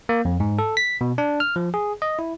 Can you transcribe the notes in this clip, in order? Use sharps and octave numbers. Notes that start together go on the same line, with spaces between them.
A#3
F2
G#2
A4
B6
B2
D4
F6
F3
G#4
D#5
E4